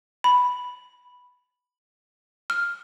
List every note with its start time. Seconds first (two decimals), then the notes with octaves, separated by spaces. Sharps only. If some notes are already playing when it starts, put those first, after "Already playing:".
0.24 B5
2.50 F6